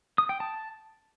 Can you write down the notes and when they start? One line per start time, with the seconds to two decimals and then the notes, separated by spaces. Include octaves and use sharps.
0.18 D#6
0.29 G5
0.40 A5